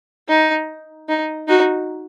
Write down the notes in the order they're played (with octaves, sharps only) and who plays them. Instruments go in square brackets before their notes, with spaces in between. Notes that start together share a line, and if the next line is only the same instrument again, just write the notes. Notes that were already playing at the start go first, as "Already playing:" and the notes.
[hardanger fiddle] D#4
D#4
[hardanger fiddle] D#4 [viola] F#4